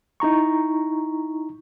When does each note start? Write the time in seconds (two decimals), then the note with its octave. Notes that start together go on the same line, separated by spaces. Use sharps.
0.20 D#4 E4 A#5 C#6